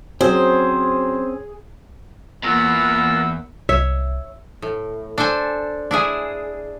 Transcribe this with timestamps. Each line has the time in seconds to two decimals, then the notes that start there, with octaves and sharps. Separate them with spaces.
0.21 F#3 C4 C#4 G#4 C5
2.44 E2 A#3 F4 A#4 B4 F#5 E6
3.69 C2 C#5 E5
4.62 A2
5.18 D4 A4 C5 G#5
5.91 D4 E4 G#4